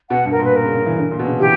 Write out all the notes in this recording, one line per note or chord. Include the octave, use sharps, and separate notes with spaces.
B2 F#5
G2
A#4
A#2
B4
A#4
C#3
C#3
E3
D3
A#2
B2
C#3
E3 G4